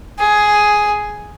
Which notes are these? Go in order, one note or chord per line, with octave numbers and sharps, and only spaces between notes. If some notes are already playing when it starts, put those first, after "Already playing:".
G#4